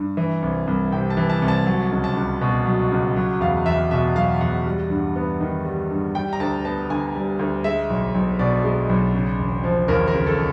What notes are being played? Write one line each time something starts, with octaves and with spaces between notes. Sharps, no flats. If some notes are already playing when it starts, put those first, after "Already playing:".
Already playing: G2
E3
C2
C2
C3 G5
A5
E3
A5
C2
A5
F#3 A5
C#2
A5
C#2
B2
F#3
C#2
F#3
E2 F5
E2 E5
B2 E5
F#3 F5
E2 F#5
G3
G2
B3
D#3
G3
G2
G3 G5
A#5
D2 A5
B3 A5
D3 G#5
G3
D2
G#3 E5
B1
B1
B2 D5
G#3
B1
C#3
E1
F3
D#2 A#4
A#4
C#3
A4